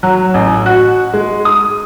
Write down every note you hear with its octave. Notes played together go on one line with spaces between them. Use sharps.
F#3
A1
F#4
G#3
D#6